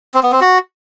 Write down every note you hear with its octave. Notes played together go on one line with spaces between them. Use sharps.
C4
B3
C4
F#4